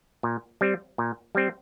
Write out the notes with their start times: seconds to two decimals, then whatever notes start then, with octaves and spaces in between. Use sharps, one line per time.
0.23 A#2
0.61 G3 C4
0.98 A#2
1.35 G3 C4